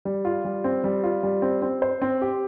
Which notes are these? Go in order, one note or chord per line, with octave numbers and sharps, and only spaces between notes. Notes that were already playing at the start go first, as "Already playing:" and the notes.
G3
F4
G3
C4
G3
F4
G3
C4
C4
C5
C4
G4